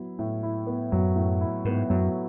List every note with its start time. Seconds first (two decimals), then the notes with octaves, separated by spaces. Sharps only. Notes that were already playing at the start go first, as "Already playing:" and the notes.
Already playing: F#3 B3 E4
0.19 A2
0.43 E4
0.67 B3
0.92 F#2 F#3
1.16 A2
1.41 E4
1.65 G#2 B3
1.90 F#2 F#3